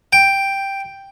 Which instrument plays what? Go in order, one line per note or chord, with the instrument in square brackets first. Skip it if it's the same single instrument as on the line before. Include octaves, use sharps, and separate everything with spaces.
[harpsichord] G5